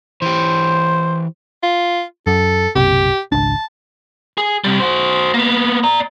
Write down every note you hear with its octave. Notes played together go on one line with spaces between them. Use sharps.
E3 G4 C5
F4
F#2 A4
F#1 B1 C3 G4
G#1 C#2 D4 A5
G#4
C3 G3
F#4 C5
A#3 B3
D5 A#5